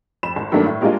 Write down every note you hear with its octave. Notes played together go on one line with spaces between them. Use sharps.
F2 B5 E7
G#1
G2 D#3 F#3 A3 A#3 D4
A2
G3 G#3 A#3 D4 F4 D#5